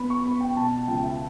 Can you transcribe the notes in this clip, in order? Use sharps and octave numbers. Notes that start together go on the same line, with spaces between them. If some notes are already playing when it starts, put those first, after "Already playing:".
Already playing: B3 B5
C#6
B3 B5
G5
B2 A5
C#2 G5
E5